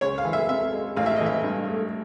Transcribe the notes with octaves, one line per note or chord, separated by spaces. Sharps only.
C#2 C#5
F5
E3
E5
C3 E5
G#3
A1 F5
E5
E3 D#5
E5
G2
A3